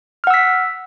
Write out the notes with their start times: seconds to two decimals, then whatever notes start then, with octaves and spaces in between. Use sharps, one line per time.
0.24 F6
0.27 F#5
0.30 E6
0.34 B6